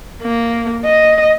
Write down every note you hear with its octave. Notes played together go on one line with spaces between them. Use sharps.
A#3
D#5